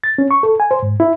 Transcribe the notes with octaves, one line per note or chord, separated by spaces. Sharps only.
A6
C#4
C#6
A4
G#5
C5
G#2
E4